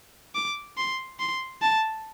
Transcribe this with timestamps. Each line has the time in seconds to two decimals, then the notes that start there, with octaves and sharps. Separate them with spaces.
0.35 D6
0.77 C6
1.19 C6
1.62 A5